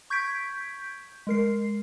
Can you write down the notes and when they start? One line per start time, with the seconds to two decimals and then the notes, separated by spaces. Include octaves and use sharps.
0.10 C#6 G6 G#6 B6 D7
1.27 G#3 A#4 C7